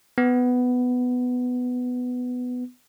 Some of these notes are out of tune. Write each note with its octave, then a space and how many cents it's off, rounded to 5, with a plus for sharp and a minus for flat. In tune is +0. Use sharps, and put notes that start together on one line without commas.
B3 +10